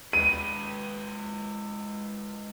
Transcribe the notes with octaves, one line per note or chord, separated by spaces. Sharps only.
G#3 B4 D#7